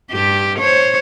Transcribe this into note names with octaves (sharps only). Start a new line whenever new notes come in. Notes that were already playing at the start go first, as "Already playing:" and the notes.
G2 G4
C5 C#5